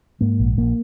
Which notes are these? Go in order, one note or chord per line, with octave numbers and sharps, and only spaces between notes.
G#2 A#3
A#1
A#1 A#3